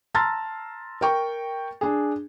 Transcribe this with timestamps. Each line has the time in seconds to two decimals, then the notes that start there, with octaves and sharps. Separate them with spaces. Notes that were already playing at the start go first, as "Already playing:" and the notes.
0.15 A5 A#5 C6 E6 F6 A6
1.01 A#4 G5 C#6
1.81 D4 G#4